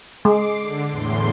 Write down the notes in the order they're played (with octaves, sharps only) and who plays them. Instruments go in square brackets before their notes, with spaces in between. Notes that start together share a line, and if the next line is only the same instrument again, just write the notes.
[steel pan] G#3 [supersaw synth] D6 C7
[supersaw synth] D3
E2 A2 C6